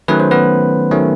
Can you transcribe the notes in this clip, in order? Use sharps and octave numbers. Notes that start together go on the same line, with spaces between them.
D#3 F#3 A3 C#4 B4
C5
B3 B4
D#3 F#3 A3 C#4